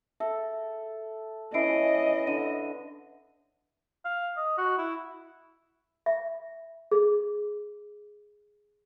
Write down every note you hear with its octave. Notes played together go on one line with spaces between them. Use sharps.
A4 E5
E3 C#4 E4 D#5 E5 C7 D7
D3 D#7
F5
D#5
F#4
E4
E5
G#4